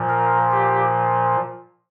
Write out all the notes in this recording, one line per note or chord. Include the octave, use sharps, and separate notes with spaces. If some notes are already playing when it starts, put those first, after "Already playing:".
Already playing: A#2 F3
A#4
G4